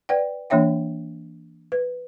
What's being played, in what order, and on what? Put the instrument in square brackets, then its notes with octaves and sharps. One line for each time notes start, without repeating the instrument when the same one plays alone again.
[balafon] B4 D5 F#5 G5
E3 A#3 D4 C#5 E5 G5
B4